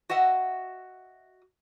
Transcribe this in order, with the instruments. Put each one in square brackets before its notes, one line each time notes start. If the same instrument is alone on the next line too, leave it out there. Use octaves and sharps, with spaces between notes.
[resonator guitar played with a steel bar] F#4 D#5 E5 F#5